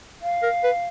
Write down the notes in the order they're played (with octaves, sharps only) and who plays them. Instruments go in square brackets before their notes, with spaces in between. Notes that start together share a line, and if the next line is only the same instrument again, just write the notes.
[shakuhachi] F5
[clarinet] A#4
B4